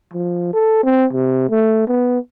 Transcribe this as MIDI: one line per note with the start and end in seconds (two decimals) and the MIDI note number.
0.14 0.50 53
0.53 0.82 69
0.84 1.05 60
1.13 1.46 48
1.50 1.84 57
1.87 2.18 59